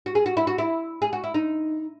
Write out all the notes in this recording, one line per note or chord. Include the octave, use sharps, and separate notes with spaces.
F#4
G#4
F#4
E4
F#4
E4
G#4
F#4
E4
D#4